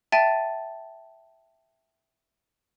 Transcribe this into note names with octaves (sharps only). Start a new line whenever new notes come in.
E5 G5 A5 A6 D#7